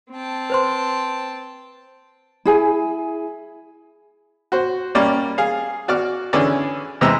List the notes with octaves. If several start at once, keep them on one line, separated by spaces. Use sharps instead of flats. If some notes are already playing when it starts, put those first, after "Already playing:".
C4 G5 A5
B4 C5 C6
E4 G#4 G#5
F#4 C5
G3 A#3 C#4 D5
G#4 F5
F#4 D5 D6 F6
D3 E3 C#4 G#4 C#5 D5
E2 C3 E3 G#3 A#5 E6